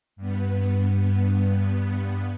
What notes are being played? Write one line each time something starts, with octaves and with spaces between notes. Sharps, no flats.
G2 B3